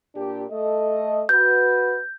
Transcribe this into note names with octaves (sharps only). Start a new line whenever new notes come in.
A#2 D4 G4
A3 A4 D#5
F#4 B4 G6